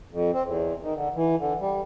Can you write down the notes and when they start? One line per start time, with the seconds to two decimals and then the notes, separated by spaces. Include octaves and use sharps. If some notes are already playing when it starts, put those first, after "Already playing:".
0.11 F2
0.33 C4
0.46 E2
0.82 D#3
0.95 D3
1.15 E3
1.39 D3
1.60 G3